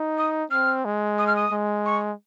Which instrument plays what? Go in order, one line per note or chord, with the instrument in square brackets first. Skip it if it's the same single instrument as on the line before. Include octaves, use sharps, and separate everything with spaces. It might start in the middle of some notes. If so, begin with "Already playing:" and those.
Already playing: [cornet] D#4
[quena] D#6
[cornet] C4 [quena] F6
[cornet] G#3
[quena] D#6
F6
D#6
[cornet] G#3
[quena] C#6